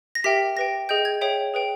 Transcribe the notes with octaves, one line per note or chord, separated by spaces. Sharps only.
A#6
G4 A#4 E5 G5 B6
G4 B4 G5 A#6
G#4 D#5 G5 G6
G#6
G#4 C#5 E5 G5
G#4 B4 G5